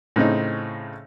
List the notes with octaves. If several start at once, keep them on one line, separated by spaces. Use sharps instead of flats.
A2 C#3 C4 D#4